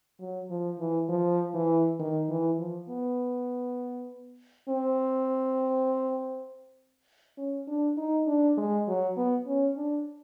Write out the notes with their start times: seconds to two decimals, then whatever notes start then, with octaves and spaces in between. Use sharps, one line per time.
0.20 F#3
0.50 F3
0.79 E3
1.09 F3
1.54 E3
1.99 D#3
2.30 E3
2.59 F3
2.89 B3
4.69 C4
7.37 C#4
7.67 D4
7.97 D#4
8.27 D4
8.57 G#3
8.87 F#3
9.17 B3
9.47 C#4
9.77 D4